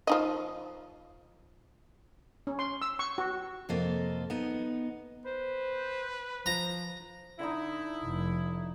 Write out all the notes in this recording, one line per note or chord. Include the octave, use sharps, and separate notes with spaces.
F3 D#4 D#5
C#4
C6
E6
C#6
F#4
F2 C3 A#3 F4 A4 D#5
B3 D#4
B4 C5
F3 A#5
D3 D#4 E4
F1